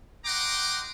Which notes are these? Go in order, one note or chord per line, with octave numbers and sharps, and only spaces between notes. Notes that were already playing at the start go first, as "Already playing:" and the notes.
D#5 F#5 G5 A#5 C6 D6